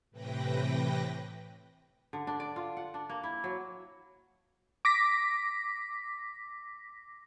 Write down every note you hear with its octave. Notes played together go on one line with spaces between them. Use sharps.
A2 C3 E3 B4 G5 A#6
D3
D4
D5
F4
F#5
D4
A#3
E4
F#3
D6 A#6 B6